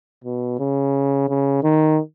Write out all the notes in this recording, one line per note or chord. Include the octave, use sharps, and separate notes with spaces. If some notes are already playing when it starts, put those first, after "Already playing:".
B2
C#3
C#3
D#3